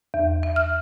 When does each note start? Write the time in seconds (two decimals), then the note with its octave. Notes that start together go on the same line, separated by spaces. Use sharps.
0.14 E2
0.43 E5
0.56 F6